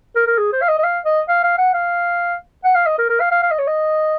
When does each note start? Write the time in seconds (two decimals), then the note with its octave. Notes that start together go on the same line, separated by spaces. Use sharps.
0.16 A#4
0.27 A#4
0.38 G#4
0.53 C5
0.62 F5
0.69 D#5
0.79 D#5
0.84 F5
1.05 D#5
1.29 F5
1.44 F5
1.58 F#5
1.74 F5
2.64 F#5
2.75 F5
2.87 D#5
2.98 A#4
3.10 A#4
3.20 F5
3.31 F5
3.43 F5
3.51 D#5
3.59 C#5
3.67 D#5